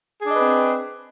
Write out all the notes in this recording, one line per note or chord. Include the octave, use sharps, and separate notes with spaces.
C4 D4 G#4 B4 D#5